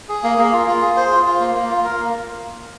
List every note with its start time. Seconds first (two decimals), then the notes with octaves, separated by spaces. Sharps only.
0.09 G#4
0.23 A#3
0.38 A#3
0.52 F4
0.68 F4
0.82 G#4
0.96 C5
1.11 F4
1.26 F4
1.40 A#3
1.55 A#3
1.70 F4
1.84 A#4
1.99 A#3